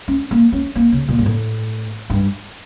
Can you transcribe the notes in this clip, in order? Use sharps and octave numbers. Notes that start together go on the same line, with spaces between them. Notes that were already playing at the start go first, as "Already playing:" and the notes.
C#4
A#3
C#4
A#3
C#3
A#2
G2
A2
G2